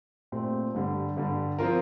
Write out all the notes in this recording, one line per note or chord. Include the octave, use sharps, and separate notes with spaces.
A#2 A3 C4 G4
G2 D3 G3
G2 D3 G3
F3 C4 F4 A#4